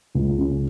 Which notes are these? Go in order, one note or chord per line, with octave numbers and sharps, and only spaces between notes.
C#2
C#4